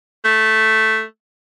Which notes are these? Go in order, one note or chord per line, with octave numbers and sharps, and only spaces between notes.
A3